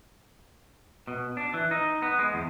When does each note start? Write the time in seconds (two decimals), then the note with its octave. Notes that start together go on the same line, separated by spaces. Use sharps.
1.07 B2
1.37 D4
1.54 E3
1.71 D#4
2.02 B3
2.19 G#3
2.34 E2